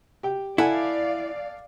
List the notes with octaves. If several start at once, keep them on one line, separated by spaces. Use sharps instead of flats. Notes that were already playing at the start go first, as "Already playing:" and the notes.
G4 G5
E4 A4 D5 F5 F#5 G#5